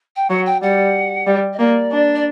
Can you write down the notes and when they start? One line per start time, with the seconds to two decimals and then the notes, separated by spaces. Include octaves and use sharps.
0.16 G5
0.30 F#3 F#5
0.46 G5
0.62 G3 F#5
1.27 G3
1.53 D#5
1.59 A#3 D5
1.92 D4
2.15 D5